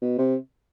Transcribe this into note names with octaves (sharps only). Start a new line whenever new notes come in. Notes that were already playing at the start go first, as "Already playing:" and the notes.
B2
C3